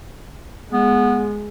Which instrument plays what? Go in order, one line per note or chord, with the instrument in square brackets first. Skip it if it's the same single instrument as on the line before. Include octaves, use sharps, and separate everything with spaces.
[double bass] G#3 [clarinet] B3